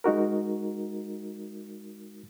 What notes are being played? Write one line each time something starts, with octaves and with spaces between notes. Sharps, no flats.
G#3 D#4 F#4 A#4